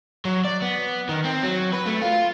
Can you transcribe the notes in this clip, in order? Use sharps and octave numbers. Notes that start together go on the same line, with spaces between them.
F#3
D5
B3
D#3
C4
F#3
B4
A3
F4